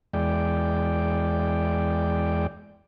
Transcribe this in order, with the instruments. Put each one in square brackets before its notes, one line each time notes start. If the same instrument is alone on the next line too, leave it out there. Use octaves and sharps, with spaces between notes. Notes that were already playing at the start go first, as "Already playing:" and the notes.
[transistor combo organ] E2 G#3 D5 G5